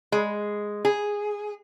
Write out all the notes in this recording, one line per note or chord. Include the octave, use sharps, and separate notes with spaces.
G#3
G#4